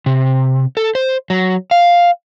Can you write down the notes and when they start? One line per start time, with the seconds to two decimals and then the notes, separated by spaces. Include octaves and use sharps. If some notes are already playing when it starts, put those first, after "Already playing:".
0.06 C3
0.77 A4
0.95 C5
1.30 F#3
1.71 F5